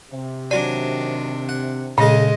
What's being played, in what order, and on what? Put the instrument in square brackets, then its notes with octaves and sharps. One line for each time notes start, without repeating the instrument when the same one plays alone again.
[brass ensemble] C3
[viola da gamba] D#3 D4 [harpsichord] F#3 G#5 [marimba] D5
[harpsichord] F#5
[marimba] A#2 [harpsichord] C#3 A4 [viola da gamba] G#3 D#5